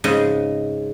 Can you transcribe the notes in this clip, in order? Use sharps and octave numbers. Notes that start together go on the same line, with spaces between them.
G#2 C#3 D#5